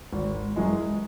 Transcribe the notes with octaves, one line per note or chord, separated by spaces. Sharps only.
G#1
F#2 E3 G#3